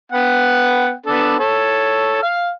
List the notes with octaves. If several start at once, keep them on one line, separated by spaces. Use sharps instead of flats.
B3 F#5 G5
B3 D4 A4
A4 C#5
F5 F6